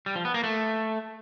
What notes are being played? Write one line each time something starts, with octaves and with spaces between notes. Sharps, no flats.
G3
F3
B3
A#3
A3